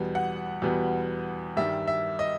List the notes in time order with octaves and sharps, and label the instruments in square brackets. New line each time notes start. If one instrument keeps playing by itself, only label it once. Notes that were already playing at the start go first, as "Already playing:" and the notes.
Already playing: [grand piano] E2 B2 G3 B3
F#5
E2 B2 G3 B3
G2 D#3 G3 E5
E5
D#5